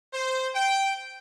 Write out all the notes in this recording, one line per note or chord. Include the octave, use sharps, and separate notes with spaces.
C5
G5